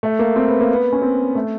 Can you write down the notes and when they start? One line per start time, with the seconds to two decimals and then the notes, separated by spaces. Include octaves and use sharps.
0.03 A3
0.19 A#3
0.36 C4
0.48 B3
0.61 A#3
0.73 B3
0.93 C#4
1.02 C4
1.35 A3